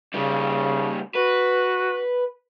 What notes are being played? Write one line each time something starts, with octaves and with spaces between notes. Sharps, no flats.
A#2 C#3 G3
F#4 B4